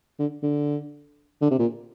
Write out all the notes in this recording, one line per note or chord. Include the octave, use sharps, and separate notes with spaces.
D3
D3
D3
C3
A#2